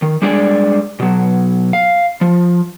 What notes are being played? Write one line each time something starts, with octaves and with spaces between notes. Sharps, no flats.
D#3
G3 G#3 D4 G#4 D5
B2 F#3
F5
F3